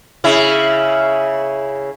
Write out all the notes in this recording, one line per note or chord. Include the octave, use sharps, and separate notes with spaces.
C#3 E4